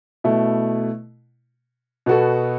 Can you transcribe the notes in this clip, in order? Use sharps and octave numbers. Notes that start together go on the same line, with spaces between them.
B2 A3 E4
B2 B3 F#4 A4